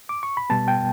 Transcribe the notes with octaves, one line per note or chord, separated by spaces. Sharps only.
D6
C#6
B5
B2 G3 B3 A5
G5